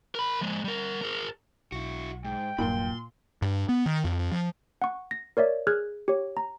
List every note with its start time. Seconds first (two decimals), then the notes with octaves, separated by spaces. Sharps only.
0.15 A#4 B5
0.41 F3 G#3
0.64 G3 A#4
1.02 G#4 A#4
1.72 B1 E4 F#4
2.25 G#2 G5
2.58 D#1 G2 A#2 F#3 B5 C6
3.42 G2
3.69 B3
3.86 D#3
4.05 F2
4.31 F3
4.82 F#5 C#6
5.11 A#6
5.37 A#4 C#5 D5 E5
5.67 G#4 F6 F#6 G#6
6.08 G4 C#5
6.37 A#5